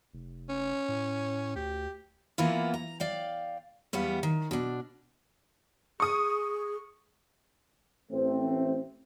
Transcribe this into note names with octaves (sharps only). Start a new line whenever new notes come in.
F1
C#4
A2
D2 G4
E3 A#3 B3 E4 F4
A#5
D5 F5 G5
E2 G3 B3 F5
D#3
B2 D4
G#4 C#6 D#6
A1 A3 C4